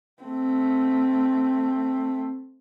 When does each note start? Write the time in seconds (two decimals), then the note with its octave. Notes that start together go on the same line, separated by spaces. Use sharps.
0.23 A3 C4